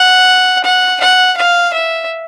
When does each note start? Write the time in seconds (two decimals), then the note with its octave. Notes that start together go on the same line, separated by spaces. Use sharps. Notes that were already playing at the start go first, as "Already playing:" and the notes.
Already playing: F#5
0.64 F#5
1.01 F#5
1.37 F5
1.73 E5